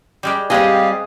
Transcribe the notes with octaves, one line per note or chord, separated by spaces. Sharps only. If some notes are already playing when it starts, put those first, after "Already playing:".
G3 G#3 G4
G3 G#3 C4 G4 D#5 F5 G#5 D#6